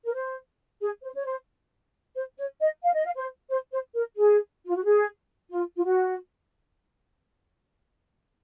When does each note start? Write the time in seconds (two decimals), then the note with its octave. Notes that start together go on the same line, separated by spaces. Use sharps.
0.05 A#4
0.14 C5
0.81 G#4
1.03 C5
1.16 C#5
1.26 C5
2.15 C5
2.37 C#5
2.60 D#5
2.83 F5
2.94 D#5
3.05 F5
3.16 C5
3.49 C5
3.72 C5
3.94 A#4
4.17 G#4
4.66 F4
4.75 F#4
4.85 G#4
5.51 F4
5.77 F4
5.84 F#4